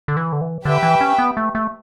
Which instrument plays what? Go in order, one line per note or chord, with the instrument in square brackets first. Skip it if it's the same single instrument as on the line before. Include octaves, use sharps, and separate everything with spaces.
[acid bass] D3
E3
D3
E3
[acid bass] D3 [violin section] G4 B4 E5 G5
[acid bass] E3
C#4
B3
A3
A3